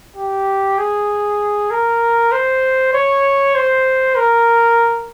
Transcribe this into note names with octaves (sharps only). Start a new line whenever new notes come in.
G4
G#4
A#4
C5
C#5
C5
A#4